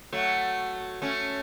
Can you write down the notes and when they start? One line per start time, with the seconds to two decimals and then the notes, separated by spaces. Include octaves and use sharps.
0.13 F#3 A3
1.02 A3 C#4